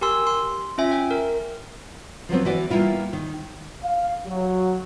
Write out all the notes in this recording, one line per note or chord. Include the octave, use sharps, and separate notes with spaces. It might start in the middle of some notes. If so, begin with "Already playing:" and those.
G4 A#4 G#5 C6 E6
C6
C#4 F4 E5 G#5
G5
A#4
F3 F#3 B3 C4
E3 E4 F#4 D5
G3 A#3 B3 E4 F4
D#3
F5
F#3